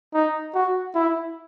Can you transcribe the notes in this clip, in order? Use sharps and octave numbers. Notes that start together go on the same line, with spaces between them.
D#4
F#4
E4